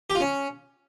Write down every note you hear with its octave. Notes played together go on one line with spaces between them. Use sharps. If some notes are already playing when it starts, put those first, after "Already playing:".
G4
F4
C#4